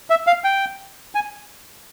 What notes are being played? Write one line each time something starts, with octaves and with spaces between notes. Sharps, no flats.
E5
F5
G5
G#5